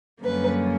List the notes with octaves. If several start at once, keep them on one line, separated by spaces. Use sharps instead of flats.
F#2 D3 G3 A#3 C#4 B4